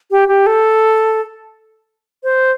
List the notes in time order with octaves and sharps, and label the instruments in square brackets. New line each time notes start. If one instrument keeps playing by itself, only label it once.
[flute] G4
G4
A4
C5